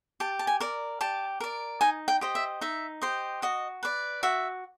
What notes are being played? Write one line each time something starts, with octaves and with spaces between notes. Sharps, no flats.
G4 A5
A5
G#5
A#4 D5
G4 A5
A#4 D5
D#4 G#5
G5
G4 C5 D#5
E5
D#4 E5
G4 C5 D#5
F#4 D#5
B4 D5
F#4 E5